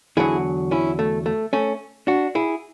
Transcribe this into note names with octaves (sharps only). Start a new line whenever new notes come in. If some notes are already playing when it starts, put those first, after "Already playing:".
E2 D3 F#3 E4 G#4
C#4 E4
A3
A3
A3 C#4
D4 F#4
E4 G#4